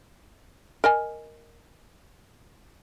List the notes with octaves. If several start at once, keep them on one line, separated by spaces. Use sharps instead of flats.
A#4 D#5 G#5